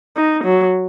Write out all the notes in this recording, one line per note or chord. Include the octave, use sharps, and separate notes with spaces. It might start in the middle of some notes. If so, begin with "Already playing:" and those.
D#4
F#3